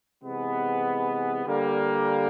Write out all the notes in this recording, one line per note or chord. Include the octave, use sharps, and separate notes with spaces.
C3 E3 G#3 B3
D3 G3 A#3